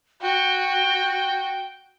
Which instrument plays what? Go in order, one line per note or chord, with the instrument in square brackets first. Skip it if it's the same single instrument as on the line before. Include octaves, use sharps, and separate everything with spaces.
[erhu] F#4 [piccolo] G5